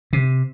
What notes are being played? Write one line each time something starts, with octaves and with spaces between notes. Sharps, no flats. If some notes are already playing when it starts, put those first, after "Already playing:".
C3